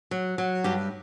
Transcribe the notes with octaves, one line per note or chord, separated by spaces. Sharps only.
F#3
F#3
G2 G4